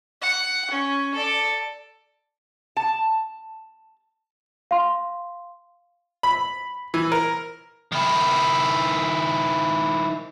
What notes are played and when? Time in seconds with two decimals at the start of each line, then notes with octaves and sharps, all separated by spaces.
0.22 F#5
0.71 C#4
1.14 A4 D5
2.77 A5
4.71 F5 C6
6.23 B5
6.94 E3
7.12 A#4
7.92 D#3 E4